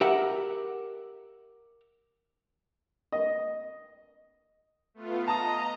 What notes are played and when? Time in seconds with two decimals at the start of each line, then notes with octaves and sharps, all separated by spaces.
0.01 G4 A#4 E5 F#5
3.12 D#5
4.94 A3 B3 F4
5.28 D#5 A5 A#5 D#6